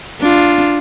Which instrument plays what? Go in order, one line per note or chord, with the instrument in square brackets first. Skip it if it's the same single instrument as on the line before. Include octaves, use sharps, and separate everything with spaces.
[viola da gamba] D4 F4